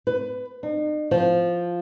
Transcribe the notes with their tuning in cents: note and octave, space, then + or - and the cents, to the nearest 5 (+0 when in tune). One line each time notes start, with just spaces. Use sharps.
B4 +20
D#4 -45
F3 +0